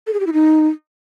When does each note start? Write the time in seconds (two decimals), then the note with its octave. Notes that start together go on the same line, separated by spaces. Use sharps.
0.07 A4
0.13 G#4
0.20 G4
0.27 E4
0.33 D#4